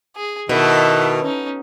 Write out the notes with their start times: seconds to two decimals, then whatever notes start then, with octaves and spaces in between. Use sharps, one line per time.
0.16 G#4
0.49 B2 D#3 E4 A4
1.22 C#4 D#4